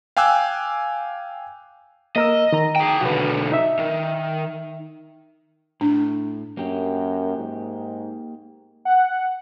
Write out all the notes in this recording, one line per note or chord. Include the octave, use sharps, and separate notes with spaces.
F5 G5 G#5 D6 E6 F#6
A#3 A#4 D#5 E6
D#3 A#5
G#4 G5
B1 D3 F#4 B4
D#4 E5
D#3
A2 D4
F#2 A#3 G4
G#2
F#5